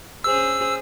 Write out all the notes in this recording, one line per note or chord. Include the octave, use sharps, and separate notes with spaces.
C#4 G#4 C5 E6